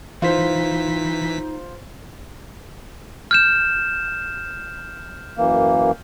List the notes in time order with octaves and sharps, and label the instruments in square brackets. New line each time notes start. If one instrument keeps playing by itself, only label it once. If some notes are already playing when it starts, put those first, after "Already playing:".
[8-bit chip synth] E3 B6 [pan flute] D#4 [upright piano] F4 C5
[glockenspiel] F6 G6 E7
[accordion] F#2 E3 A#3